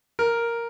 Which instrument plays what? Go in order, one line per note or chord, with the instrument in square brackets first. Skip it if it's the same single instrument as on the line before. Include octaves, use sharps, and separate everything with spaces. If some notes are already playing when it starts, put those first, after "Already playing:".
[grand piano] A#4